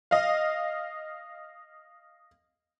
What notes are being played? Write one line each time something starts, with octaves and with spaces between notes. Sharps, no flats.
D#5 F5